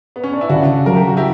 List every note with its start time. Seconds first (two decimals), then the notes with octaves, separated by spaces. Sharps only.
0.16 B3
0.24 C#4
0.33 D4
0.41 E4
0.49 C#3 D4 F#4
0.86 F#3 A#4
0.96 G4
1.07 F#4
1.17 E4 G4